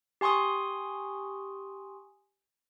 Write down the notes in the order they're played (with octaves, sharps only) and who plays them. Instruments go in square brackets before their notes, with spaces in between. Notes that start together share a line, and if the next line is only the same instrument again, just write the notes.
[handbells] G4 G#5 C6 C#6 D#6